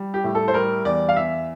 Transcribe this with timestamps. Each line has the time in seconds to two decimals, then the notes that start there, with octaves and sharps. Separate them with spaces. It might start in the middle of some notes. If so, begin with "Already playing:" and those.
Already playing: G3
0.14 G4
0.24 A2
0.35 A4
0.48 C5
0.54 G3 A#4
0.85 E2 D5
1.09 F5
1.16 E2 E5